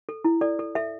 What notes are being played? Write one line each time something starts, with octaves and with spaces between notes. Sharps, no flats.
A4
E4
A4 D5
A4
A4 E5